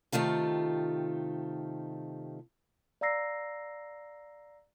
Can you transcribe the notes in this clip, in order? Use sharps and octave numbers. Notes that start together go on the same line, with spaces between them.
C3 D#3 A3 F4 G4
D5 F5 A#5 E6 A#6 C7